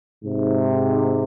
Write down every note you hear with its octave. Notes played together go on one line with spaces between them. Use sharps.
G#2 C3